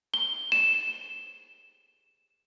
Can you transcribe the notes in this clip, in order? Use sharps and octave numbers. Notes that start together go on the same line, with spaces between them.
G7
E7